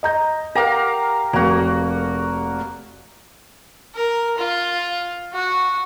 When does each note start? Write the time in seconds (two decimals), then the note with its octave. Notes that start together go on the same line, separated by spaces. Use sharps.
0.03 D#5 A#5 G6
0.55 G4 A#4 F5 F#5 A#5
1.33 F1 F2 A#3 F#4
3.95 A#4
4.38 F4
5.33 F#4